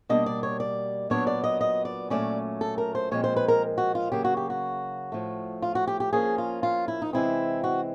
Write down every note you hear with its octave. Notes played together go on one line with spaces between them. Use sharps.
B2 G3 A#3 D4 D#5
D5
C#5
D5
A#2 F#3 B3 D4 C#5
D5
D#5
D#5
D5
A#2 F#3 A3 C#4 D5
A4
A#4
C5
A#2 F3 G#3 C4 C#5
C5
B4
A#4
F#4
F4
C#3 F#3 A#3 G4
F#4
G4
F#4
A2 F3 A3
F4
F#4
G4
G4
F3 A#3 C#4 G#4
F4
F4
E4
D#4
C3 E3 G#3 C4 E4
F#4